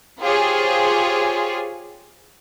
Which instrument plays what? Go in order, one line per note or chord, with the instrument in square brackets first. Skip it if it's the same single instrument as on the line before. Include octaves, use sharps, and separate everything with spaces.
[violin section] F4 G4 G#4 C5 C#5